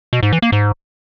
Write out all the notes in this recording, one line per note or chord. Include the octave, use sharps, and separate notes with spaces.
B2
G#2
E3
A#3
G#2